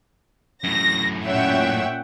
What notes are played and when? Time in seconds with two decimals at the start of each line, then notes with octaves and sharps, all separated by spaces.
0.64 F#2 A2 A#6
1.26 A#2 C#4 C#5 E5 F#5 G5